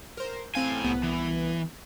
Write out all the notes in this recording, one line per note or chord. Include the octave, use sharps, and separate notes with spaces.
A#4 C5
A2 C4 F5 G#5
C2 B3
E3